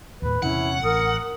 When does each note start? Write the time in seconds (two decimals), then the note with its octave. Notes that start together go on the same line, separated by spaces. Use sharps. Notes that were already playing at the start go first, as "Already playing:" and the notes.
0.22 D#2 A2 B4
0.43 E2 C3 E3 C#4 E4 F#5
0.83 A1 A#4 D#6